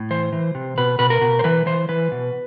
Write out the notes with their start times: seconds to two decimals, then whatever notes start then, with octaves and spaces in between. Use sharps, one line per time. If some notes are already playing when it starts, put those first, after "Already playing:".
Already playing: A2
0.10 E3 C5
0.33 E3
0.55 C3
0.78 B2 B4
0.99 B2 B4
1.10 A#4
1.21 B2
1.39 C5
1.44 E3 B4
1.66 E3 C5
1.89 E3 B4
2.12 B2